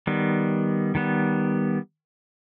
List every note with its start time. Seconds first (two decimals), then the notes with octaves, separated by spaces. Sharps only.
0.07 D#3 G3 B3
0.95 D#3 G3 B3